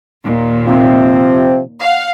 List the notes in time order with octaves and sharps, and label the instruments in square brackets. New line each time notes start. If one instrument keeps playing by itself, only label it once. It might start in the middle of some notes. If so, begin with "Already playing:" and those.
[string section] D#2 A#2
[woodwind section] C3 F3 C4
[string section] F5 F#5